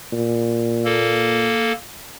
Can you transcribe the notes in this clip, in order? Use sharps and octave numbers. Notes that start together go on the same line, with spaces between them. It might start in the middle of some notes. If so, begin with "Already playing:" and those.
A#2
A#3 A4